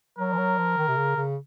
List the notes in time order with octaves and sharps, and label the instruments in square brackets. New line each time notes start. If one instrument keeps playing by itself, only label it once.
[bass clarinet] F#3 [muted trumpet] A#4
[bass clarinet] F3
F#3
F3
D#3
C3
C#3
C#3